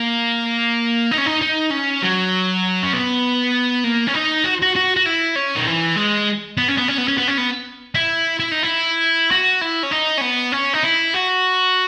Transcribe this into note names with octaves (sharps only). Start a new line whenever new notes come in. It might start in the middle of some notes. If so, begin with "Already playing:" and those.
Already playing: A#3
D#4
C#4
D#4
D#4
C#4
F#3
C#4
B3
A#3
C#4
D#4
F#4
F#4
F#4
F#4
E4
C#4
D#3
E3
G#3
B3
C#4
B3
C#4
B3
C#4
B3
C#4
B3
E4
E4
D#4
E4
F#4
E4
C#4
D#4
C#4
B3
C#4
D#4
E4
F#4